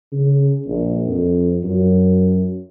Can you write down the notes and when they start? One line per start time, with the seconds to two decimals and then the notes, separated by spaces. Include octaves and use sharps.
0.12 C#3
0.67 A#1
1.07 F2
1.63 F#2